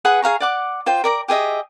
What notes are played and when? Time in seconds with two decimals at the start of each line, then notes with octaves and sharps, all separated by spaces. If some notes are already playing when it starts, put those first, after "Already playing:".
0.05 G#4 B4 F#5 D#6
0.22 G#4 F5 A#5 C#6
0.40 D5 F#5 D6
0.86 F4 C5 G5
1.04 A#4 D5 A#5
1.28 G4 G#4 D#5 E5